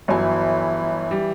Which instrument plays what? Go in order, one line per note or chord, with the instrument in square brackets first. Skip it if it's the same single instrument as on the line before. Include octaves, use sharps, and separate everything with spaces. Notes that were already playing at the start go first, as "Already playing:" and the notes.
[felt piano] G1 F#3 G#5 [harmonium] E3
[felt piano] G3